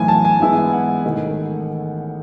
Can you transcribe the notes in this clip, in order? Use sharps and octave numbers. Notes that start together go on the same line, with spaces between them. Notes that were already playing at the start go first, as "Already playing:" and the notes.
Already playing: B1 A2 E3 G#5
A5
G#5
G#2 E3 G#3 B3 E4
F#5
A1 G#2 D#3 A3 D#4